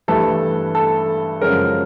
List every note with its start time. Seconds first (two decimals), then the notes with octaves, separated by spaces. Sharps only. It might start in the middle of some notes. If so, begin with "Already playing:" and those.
0.08 G2 E3 A3 A4
0.75 A4
1.42 F#2 C#3 F3 G#3 A#4